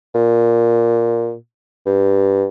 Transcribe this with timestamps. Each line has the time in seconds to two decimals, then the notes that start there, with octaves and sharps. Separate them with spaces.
0.14 A#2
1.86 G2